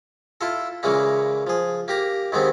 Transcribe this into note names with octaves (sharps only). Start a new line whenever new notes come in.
E4 F4 A4
A#2 C#3 E3 G#3 A#3
F3 G#4
A#3 G4 A#5
D#2 D#3 G#3 B3 C4